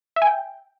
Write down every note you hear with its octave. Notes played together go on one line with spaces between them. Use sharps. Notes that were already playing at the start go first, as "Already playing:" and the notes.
E5
G#5
G5